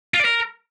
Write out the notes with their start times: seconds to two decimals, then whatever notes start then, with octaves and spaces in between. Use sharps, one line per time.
0.14 F4
0.20 D5
0.25 A#4